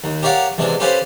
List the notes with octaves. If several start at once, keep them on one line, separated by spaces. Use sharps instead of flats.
D#2
G4 A#4 C#5 D5 F5 F#5
E2 C3 G#3 D4
C#4 G4 A4 B4 C5 F5